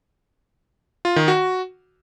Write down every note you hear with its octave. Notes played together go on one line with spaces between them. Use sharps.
F4
D#3
F#4